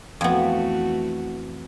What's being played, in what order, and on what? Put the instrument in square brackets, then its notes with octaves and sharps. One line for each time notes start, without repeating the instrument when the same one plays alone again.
[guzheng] F2 B3 [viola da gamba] E3 A3 F#4